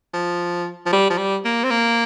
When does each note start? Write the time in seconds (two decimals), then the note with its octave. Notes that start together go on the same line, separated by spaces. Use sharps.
0.14 F3
0.86 F3
0.92 G3
1.10 F3
1.18 G3
1.45 A#3
1.63 C4
1.70 A#3